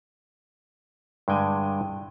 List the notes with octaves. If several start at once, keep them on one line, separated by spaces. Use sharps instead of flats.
G2 D3 G#3 G5 G#5